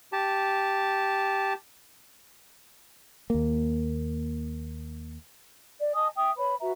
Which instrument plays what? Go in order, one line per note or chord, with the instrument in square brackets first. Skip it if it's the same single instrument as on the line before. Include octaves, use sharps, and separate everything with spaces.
[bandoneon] G4 A5
[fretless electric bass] D#2 A#3
[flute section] D5
D#5 G#5 A5 D#6
E5 G5 D#6
B4 C#5 B5
F#4 B4 E5 A#5